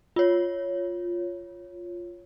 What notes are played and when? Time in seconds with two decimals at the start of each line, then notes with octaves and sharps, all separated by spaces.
0.16 F4 C#5